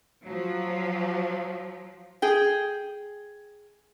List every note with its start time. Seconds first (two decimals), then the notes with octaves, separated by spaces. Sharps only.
0.24 F3 F#3
2.22 G#4 G5